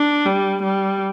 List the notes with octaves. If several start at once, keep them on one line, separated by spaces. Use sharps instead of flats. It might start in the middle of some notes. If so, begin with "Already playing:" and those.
Already playing: D4
G3
G3